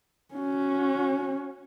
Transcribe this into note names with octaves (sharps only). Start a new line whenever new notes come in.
C#4 F#4